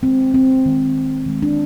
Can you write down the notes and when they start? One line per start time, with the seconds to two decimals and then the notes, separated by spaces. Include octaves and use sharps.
0.02 D#3 G#3 C4
0.34 C4
0.65 D#3 G#3
1.26 D#3 G#3
1.42 D4